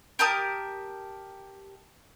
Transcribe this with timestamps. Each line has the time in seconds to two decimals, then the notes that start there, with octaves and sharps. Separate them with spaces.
0.19 G4 A#4 A5 D#6